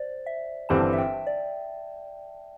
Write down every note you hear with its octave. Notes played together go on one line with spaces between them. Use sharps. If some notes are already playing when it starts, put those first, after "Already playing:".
Already playing: C5 D5
E5
G1 G2 E3 C4 G4 A5
E5
G5
D5